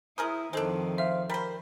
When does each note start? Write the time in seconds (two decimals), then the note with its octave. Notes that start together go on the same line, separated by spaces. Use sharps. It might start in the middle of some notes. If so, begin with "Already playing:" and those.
0.18 E4 G#4 A#4 C5 D#6
0.53 F2 D#3 G#3 D4 A4 C5
0.98 C5 E5 F5
1.29 G3 A#4 C5 B5